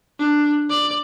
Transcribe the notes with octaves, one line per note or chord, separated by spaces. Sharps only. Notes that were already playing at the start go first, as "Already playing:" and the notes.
D4
D5